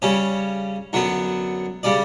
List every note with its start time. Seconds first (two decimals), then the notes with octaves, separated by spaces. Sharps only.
0.02 C#3 G3 C#4 C#5
0.93 F#2 D3 F#3 B3
1.83 C#3 G3 D5